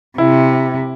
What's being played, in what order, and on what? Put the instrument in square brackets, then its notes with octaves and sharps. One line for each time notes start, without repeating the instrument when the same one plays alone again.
[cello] C3 [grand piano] E4